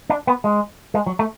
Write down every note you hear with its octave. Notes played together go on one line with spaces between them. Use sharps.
D4
B3
G#3
G#3
F#3
A3